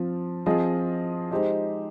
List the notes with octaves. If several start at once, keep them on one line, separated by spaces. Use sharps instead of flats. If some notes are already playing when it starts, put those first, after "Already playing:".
Already playing: F3 C4 F4
F3 C4 F4 G#4 D#5
G#3 D#4 G4 C5 D#5